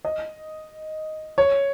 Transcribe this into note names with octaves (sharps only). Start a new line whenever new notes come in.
D#5
C#5